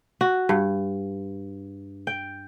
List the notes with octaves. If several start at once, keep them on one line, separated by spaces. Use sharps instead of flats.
F#4
G2
G5